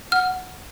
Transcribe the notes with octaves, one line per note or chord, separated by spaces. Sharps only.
F#5 F6